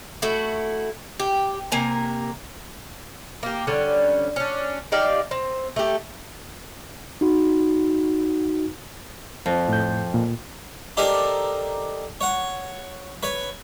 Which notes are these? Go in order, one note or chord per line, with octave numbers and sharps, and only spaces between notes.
A3 E4 F#4
G4
C3 A#3 A#4 G#5
A#3 G4
D3 G3 C#4
C#4 D4
D#4 G4 D5 F5
C4
A3 G4
D#4 F#4
F2
A2 G6
A#2
D#4 G4 A4 A#4 C5 D5
C#5 F#5
B4 C#5